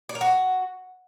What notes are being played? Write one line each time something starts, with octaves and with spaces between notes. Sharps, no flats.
D5
A#4
F#4